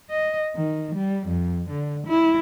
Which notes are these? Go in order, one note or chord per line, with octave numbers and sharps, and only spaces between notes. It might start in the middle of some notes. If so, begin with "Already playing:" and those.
D#5
D#3
G3
F2
D3
E4